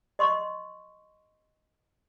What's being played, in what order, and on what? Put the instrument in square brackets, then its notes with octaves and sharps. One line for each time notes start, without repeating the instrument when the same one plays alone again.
[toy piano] D#5 C6 C#6